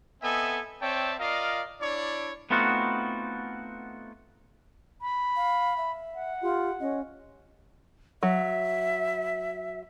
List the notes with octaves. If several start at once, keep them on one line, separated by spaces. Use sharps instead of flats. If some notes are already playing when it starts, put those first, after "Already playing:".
B3 C4 A4 D#5 E5 G#5
C4 C#5 D5 E5 G5 A5
F4 A#4 D5 D#5 F5
D4 E4 C#5 D5
A3 B3 C4 D#4 F4 F#4
B5
F5
E5
F#5
F4 G4
C#4 D#5
F#3 E5